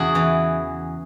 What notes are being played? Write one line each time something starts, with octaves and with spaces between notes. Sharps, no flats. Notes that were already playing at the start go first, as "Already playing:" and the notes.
Already playing: E2 C#3 F#4 G#4
E3